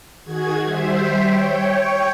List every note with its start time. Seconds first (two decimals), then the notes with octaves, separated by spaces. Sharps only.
0.24 D#3 F#4 G#4 G#6
0.64 G3 C5 E5
1.21 C#5 G5